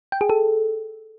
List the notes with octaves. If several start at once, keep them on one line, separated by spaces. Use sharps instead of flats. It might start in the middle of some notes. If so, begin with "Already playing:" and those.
G5
G#4
A4